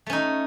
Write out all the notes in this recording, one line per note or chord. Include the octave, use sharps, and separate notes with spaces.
A3 C#4 D#4